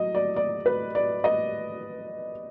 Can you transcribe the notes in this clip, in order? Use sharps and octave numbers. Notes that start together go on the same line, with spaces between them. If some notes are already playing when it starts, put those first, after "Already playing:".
Already playing: F#3 D#5
D5
D5
B4
D5
D#5